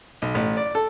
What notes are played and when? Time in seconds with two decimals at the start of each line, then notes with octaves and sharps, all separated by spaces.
0.22 B1
0.35 A1
0.57 D5
0.75 A4